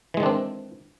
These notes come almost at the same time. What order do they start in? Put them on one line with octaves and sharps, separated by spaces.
E3 G#3 D#3 D4 C4